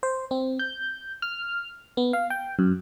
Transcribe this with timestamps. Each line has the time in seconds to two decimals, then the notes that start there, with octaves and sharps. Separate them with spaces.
0.03 C5
0.31 C4
0.59 G6
1.22 F6
1.97 B3
2.13 F5
2.30 G5
2.59 F#2